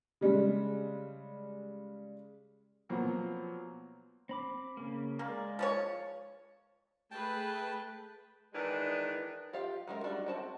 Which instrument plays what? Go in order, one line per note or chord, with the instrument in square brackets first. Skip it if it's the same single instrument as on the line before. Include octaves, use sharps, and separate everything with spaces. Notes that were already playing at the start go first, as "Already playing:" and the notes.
[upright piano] C#3 G3 G#3
[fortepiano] B2 F3 F#3 A#3 C4
[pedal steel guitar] C4 B5 D6
C#3 A#3
[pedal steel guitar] G#3 D5 [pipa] A#3
[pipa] F3 B4 C#5
[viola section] A3 G#4 B4 [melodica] G5 A5
[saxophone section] D#3 E3 G#3 D4 B4
[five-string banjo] F4 G4 F5
F#3 G#3 F4 A#4
G3 D4 D#4 F#4
C4 F#4 A5